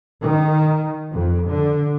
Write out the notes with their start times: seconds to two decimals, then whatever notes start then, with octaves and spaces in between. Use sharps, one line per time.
0.21 D#3
1.12 F2
1.49 D3